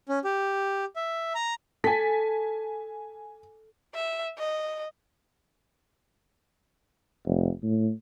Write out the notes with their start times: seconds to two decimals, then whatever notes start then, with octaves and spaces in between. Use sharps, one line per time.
0.09 C#4
0.24 G4
0.96 E5
1.35 A#5
1.84 A4 G#5 B6
3.94 E5
4.38 D#5
7.26 F1
7.63 A2